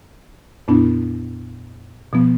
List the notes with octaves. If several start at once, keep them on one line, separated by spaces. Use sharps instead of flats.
F2 A#2 B3 D4 E4
B2 F3 B3